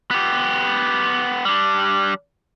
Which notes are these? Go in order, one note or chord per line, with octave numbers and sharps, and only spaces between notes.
B3 G4
G3 D4